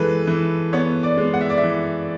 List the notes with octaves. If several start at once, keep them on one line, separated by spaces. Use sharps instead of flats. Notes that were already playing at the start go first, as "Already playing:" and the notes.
Already playing: E3 G#3 A4 B4
E3
B3 C#5
D5
G#3
F#5
E5
D5
E5
E3